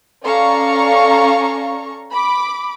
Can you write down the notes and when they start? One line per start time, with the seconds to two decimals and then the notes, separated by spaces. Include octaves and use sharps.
0.24 C#4 A4 D5 F5 A#5 C#6
2.12 B5 D6